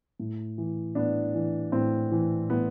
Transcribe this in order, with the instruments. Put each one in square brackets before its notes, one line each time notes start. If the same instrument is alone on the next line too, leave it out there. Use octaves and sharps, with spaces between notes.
[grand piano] A2
E3
A2 B3 D4
E3
A2 C4
E3
A2 B3